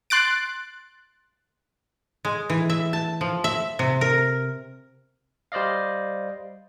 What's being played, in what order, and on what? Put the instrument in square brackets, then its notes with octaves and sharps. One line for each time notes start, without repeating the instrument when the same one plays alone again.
[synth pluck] C6 F#6 A6 D7
[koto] G#3
E3
E5
A5
F3
E5
C3
A#4
[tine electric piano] G3 C5 D5 D#5 F5